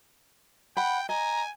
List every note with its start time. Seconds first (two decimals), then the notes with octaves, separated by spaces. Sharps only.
0.77 F#5 G5 B5
1.09 D#5 G#5 A#5